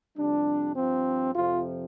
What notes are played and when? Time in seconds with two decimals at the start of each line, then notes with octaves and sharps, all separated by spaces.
0.16 F2 C3 G3 D4
0.76 G2 F3 C4
1.35 F2 C3 F3 F4